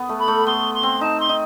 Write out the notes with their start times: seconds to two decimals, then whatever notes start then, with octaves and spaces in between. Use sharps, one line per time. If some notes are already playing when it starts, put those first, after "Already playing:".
Already playing: B3
0.09 A3
0.19 B5
0.28 A3
0.46 B3 C6
0.74 C6
0.83 C4
1.01 D#4 A5
1.19 C6
1.29 D#4